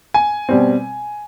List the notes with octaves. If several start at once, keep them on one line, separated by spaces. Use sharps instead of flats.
G#5
B2 G3 C4